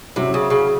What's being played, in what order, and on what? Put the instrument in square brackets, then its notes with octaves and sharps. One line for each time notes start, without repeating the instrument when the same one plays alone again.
[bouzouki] C3 [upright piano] F#3 C#4 E4
[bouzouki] C#3
C#3